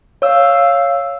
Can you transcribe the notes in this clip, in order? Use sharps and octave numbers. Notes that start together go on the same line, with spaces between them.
C#5 F5 E6